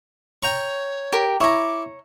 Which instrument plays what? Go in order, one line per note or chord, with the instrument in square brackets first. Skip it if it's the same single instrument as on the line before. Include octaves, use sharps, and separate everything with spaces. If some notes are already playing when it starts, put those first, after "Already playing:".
[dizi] C#5 [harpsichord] G5 A#5 C#6
[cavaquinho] G4 A#4
[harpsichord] E4 [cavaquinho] C#5 A#5 [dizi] D6